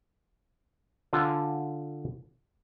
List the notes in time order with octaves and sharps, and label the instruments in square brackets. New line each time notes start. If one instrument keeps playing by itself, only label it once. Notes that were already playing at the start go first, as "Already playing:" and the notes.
[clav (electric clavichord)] D3 F4 G#5